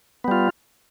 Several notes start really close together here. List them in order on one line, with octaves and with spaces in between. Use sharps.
B3 G3 F4